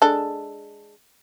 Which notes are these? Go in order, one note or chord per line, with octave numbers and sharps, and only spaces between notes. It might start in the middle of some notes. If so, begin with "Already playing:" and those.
G#3 D4 A4